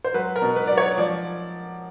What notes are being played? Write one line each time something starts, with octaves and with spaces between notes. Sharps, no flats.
C5
F#3 B4
A#4
B2
B4
F#3 D5
C#5
F3 D5